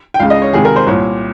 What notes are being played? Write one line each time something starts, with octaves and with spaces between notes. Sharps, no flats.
G5
C#2 C#3 F5
D#5
C#5
C#2 C3 D#3 G#4
A#4
C5
C2 A#2 C#5